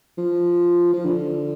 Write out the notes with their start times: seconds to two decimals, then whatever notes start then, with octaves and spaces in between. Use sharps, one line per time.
0.18 F3
0.93 F3
1.05 D3